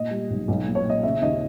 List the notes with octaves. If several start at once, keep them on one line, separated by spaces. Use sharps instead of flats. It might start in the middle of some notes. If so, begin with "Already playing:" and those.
Already playing: A#2 D#5
G3
B1
B1
A#2
C#5
A#2 D#5
C#3 E5
D#2 D#5